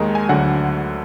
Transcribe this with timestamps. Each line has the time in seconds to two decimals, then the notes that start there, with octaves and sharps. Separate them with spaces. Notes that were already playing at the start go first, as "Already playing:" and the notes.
Already playing: D#2 D#3 G#3 D#4
0.15 G#5
0.29 D2 D3 F#3 F#5